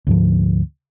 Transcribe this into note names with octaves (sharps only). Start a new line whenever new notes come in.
D2 G#2 F3